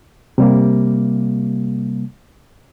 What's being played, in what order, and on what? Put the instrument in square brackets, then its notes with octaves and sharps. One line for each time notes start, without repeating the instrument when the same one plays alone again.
[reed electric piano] C3 G3 A#3